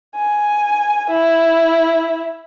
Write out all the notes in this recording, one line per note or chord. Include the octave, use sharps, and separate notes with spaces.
G#5
E4